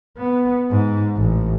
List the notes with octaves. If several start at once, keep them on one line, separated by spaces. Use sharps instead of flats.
B3
G#2
A1